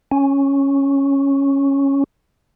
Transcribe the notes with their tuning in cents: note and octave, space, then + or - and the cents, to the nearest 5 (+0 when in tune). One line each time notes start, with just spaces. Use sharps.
C#4 -5